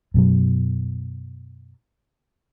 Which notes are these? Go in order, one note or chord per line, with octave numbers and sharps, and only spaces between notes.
F#2 B2 F#3